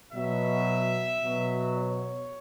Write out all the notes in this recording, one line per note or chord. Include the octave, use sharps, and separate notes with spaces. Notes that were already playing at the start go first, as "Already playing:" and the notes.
B2 F#3 E5
B2 F#3
C#5